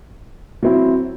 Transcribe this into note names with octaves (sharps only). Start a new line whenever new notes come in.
F#3 C4 E4